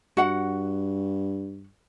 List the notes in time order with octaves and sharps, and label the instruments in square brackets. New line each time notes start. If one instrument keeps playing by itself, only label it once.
[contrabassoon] G2 [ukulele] F#4 F#5